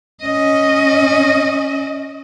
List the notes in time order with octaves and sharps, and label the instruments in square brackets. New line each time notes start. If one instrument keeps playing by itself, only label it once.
[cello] C#4 D#5